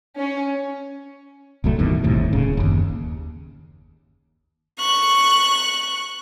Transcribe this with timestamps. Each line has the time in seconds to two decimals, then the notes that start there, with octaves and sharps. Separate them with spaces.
0.19 C#4
1.64 D1 C2 F#3 A3
1.79 G2 B2 D#3 E3
2.04 G1 D#2 A2 C3
2.33 D1 C#3
2.57 F#1 D#2
4.80 C#6 F#6